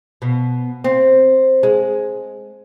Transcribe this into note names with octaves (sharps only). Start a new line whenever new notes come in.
B2
C4
G#3